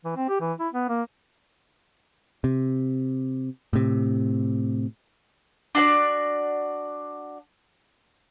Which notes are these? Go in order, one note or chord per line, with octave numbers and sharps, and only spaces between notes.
E3
C4
G4
E3
E4
B3
A#3
C3
A2 C3
D4 F#4 C#5 D5